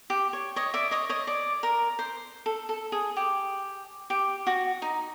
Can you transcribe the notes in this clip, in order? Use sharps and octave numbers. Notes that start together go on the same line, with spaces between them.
G4
C#5
C#5 D#5
D5 E5
C#5 D#5
C#5 D#5
D5
A#4
C5
A4
A4
G#4
G4
G4
F#4
D#4